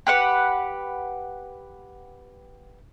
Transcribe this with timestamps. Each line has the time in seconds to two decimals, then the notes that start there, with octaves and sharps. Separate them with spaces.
0.07 G4 B4 F#5